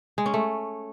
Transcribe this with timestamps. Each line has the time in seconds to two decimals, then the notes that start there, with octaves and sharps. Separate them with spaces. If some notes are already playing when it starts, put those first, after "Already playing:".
0.18 G#3
0.26 C#4
0.34 A3